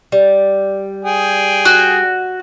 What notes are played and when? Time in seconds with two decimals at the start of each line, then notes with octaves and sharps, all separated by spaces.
0.12 G3
1.05 G#4 G5
1.65 F#4